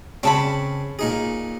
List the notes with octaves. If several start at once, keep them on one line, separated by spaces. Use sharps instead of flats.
C#3 C4 C#5 A5 B5
A#2 D#4 G#4